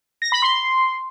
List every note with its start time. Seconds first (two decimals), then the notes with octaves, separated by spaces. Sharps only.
0.22 A#6
0.32 B5
0.42 C6